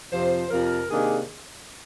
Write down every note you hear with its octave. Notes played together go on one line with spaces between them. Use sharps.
F2 C3 F3 C5
F2 C3 F3 A#4
C3 D#3 A#3 D4 G#4